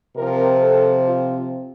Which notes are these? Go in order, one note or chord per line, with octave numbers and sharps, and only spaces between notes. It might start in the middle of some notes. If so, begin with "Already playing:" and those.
C3 F3 C4 A#4
A4
F4